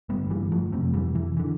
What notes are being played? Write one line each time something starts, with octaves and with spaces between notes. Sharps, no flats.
G2 D3 G3 B3
E3 G3
F3 A3
F2 C3 A3 C4
E3 G3
E3
D3 E3